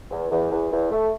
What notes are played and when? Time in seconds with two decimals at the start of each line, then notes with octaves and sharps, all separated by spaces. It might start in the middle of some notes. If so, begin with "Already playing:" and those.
0.11 E2
0.31 E2
0.51 E2
0.71 E2
0.91 A3